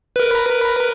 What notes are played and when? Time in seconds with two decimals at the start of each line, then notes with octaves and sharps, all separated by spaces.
0.16 A#4 B4